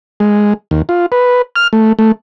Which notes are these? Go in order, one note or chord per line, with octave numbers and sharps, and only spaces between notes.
G#3
D#2
F4
B4
F6
A3
A3